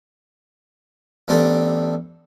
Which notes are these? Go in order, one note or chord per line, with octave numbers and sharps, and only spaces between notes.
A1 B3 C4 D4 G4 A4